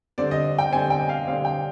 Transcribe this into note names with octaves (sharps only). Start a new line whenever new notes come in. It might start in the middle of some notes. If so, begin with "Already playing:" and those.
D3 G3 C4 D5
D#5
G5
D3 G3 C4 G#5
G5
F5
D3 G3 C4 F5
G5